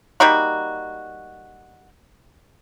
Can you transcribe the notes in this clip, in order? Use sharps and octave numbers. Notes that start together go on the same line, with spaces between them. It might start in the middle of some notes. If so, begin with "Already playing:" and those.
G3 A#3 D#4 F#4